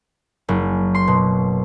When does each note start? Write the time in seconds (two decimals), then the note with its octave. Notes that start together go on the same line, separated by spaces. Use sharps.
0.49 F#1
0.95 C6
1.07 B2